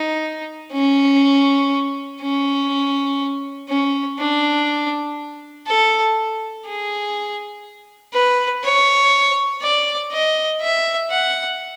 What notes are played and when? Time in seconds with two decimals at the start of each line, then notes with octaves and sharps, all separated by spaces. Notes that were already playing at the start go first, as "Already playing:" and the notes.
Already playing: D#4
0.72 C#4
2.21 C#4
3.69 C#4
4.19 D4
5.67 A4
6.65 G#4
8.13 B4
8.64 C#5
9.62 D5
10.12 D#5
10.61 E5
11.10 F#5